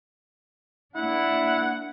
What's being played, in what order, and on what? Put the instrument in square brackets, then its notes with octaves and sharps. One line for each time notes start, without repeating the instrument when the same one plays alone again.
[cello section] A#3 D4 [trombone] E4 [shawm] F#5